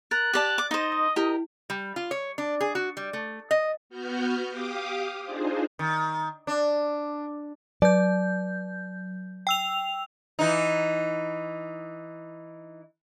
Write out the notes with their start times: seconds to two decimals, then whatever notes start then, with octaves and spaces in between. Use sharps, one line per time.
0.11 A#4 F#6 A6
0.33 G4 D5 A5
0.58 D6
0.71 D#4 C5 D#5
0.92 D#6
1.16 E4 G4 A#4
1.70 G3
1.96 F4
2.11 C#5
2.38 D4
2.61 G#4
2.75 F#4
2.97 G3
3.13 A3
3.51 D#5
3.90 B3 F#4 F6 G6
4.51 G4 F5 D6 D#6
5.24 D4 D#4 F4 G#4 C5
5.79 D#3
6.47 D4
7.82 F#3 D5 G6
9.47 G5 E6 F7
10.39 E3 D#4